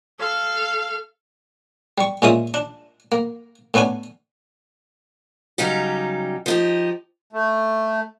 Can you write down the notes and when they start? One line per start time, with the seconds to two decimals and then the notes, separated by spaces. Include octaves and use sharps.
0.19 A4 F5
1.98 G3 C#6
2.22 A#2 G#3 C#4 F4 E5 D#6
2.54 D4
3.12 A#3
3.74 A2 B3 C#4 D4 G#5
5.58 C#3 F#3 G3 D#4 G4
6.46 F3 D#4 G4
7.33 A3